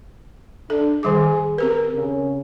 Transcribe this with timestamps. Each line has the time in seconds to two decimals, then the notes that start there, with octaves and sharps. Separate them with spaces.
0.70 D4 A4
1.03 D#3 G3 G#4 D6
1.58 C4 G4 A#4 B4
1.95 C#3